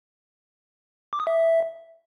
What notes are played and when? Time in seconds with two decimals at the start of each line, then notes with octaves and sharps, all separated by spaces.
1.13 D6
1.20 D#6
1.27 E5